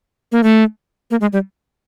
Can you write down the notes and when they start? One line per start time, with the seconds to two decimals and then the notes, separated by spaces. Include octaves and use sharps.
0.32 A#3
0.43 A3
1.11 A#3
1.21 G#3
1.33 G3